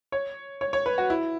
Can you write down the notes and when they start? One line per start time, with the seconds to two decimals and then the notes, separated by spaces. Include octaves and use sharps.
0.12 C#5
0.61 C#5
0.73 C#5
0.86 B4
0.98 F#4
1.10 E4